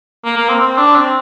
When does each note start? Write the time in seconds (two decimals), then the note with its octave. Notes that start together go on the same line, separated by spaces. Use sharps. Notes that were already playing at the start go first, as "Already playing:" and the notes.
0.25 A#3
0.37 A#3
0.49 C4
0.60 C4
0.78 D4
0.95 C4